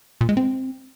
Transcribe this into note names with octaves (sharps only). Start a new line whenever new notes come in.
A#2
G#3
C4